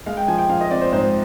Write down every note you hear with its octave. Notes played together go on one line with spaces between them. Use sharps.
G#3 F5
G5
F3 G#5
G5
F3 F5
D#5
C4 D5
C5
G#2 C5